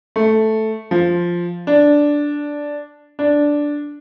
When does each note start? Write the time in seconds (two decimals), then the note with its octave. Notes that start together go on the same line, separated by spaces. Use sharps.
0.16 A3
0.91 F3
1.67 D4
3.19 D4